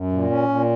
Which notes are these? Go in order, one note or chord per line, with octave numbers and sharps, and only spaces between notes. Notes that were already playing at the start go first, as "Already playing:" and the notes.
Already playing: F#2
A#2
C#4
A#2